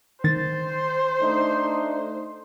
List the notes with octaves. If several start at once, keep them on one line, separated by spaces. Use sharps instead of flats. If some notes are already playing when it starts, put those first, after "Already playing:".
D#3 C5 A6
A3 D4 D#4